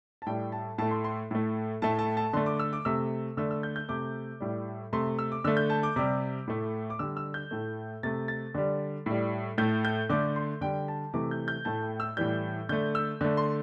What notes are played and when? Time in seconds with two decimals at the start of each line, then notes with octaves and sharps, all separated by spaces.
0.22 A5
0.26 A2 G3 G5
0.52 A5
0.78 A2 A3 A5
0.91 C6
1.04 C6
1.31 A2 A3
1.82 A2 A3 A5
1.99 A5
2.17 A5
2.33 D3 A3 C6
2.46 D6
2.59 E6
2.73 D6
2.85 C3 A3 E6
3.37 D3 A3 E6
3.51 E6
3.63 G6
3.76 G6
3.89 C3 A3 D6
4.40 A2 G3
4.93 C3 A3 C6
5.19 E6
5.32 D6
5.44 D3 A3 E6
5.57 G6
5.70 A5
5.83 D6
5.96 C3 G3 D6
6.48 A2 A3
6.90 D6
6.99 D3 G3 E6
7.17 E6
7.34 G6
7.51 A2 A3
8.03 C3 A3 A6
8.28 A6
8.54 D3 G3
9.06 A2 G3
9.58 A2 A3 G6
9.85 G6
10.09 D3 A3 D6
10.36 C6
10.61 D3 G3 G5
10.88 A5
11.13 C3 E3 A3 D6
11.31 G6
11.48 G6
11.65 A2 A3 A5
11.82 G5
12.00 E6
12.17 A2 E3 G3 G6
12.69 D3 A3 G6
12.95 E6
13.21 D3 A3
13.37 C6